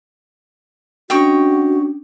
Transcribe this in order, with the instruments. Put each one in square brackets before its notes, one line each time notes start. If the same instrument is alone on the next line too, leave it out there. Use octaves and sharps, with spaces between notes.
[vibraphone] C#4 D4 [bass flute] F#4 [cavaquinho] C#5 D#5 G5